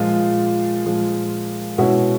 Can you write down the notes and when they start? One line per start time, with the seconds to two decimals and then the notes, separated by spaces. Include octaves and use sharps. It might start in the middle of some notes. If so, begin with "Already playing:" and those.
Already playing: A#2 F3 G#3 F4
0.86 A#2 F3 G#3
1.78 B2 G#3 C#4 E4 F#4